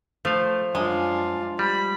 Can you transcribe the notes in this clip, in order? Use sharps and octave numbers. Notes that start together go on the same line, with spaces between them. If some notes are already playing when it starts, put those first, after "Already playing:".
F3 A3 F5
F#2 G#3 D4 F4
G3 B5